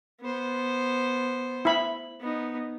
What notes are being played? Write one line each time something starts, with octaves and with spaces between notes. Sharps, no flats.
B3 C5
E4 B5
B3 D#4